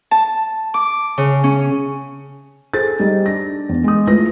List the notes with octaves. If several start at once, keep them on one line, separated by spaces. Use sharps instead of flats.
A5
D6
C#3
C#4
G#4 A4 C5 A6
G3 D#4
D4 A#6
E2
G#3 D#6
A3 E4 F4 B4 A#6